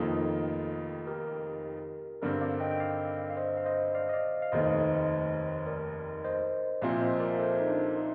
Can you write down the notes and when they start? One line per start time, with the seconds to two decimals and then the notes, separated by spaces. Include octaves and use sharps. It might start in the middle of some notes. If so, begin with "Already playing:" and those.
Already playing: F1 F2 D#3 A#3 D#4 F4 A4
1.07 G4 A#4
2.22 G2 D3 G3 C4 A#4 D5
2.41 D5 F5
2.60 D#5 G5
2.71 G5
2.80 D5 F5
3.30 F5
3.37 C5 D#5
3.57 F5
3.66 C5 D#5
3.94 D5 F5
4.09 D#5
4.13 D5 F5
4.42 F5
4.52 F1 D#2 D#3 A3 D#4 C5 D#5
5.67 A#4 D5
6.25 C5 D#5
6.82 C2 A#2 F3 C4 D5 F5
7.01 C5 D#5
7.20 A#4 D5
7.39 A4 C5
7.60 D#4
7.68 D4
7.97 D#4